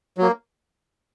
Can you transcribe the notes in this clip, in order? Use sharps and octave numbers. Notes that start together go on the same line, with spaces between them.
F#3 A#3